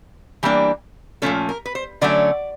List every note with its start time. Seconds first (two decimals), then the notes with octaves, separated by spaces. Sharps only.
0.43 E3 G3 A#3 D4
1.22 A#2 F3 A3 C#4 A4
1.49 A#4
1.66 B4
1.75 C5
2.01 D3 F#3 A3 C#4 D5